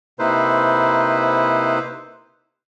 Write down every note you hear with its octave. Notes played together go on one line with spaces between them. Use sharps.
C3 A#3 D#4 E4 B4 C5